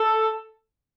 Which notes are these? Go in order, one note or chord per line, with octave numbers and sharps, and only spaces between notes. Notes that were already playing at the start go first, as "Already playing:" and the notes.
Already playing: A4